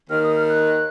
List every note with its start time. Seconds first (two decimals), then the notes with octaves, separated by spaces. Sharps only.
0.09 D#2 D#3 F6
0.23 D#6
0.36 F6
0.49 F#6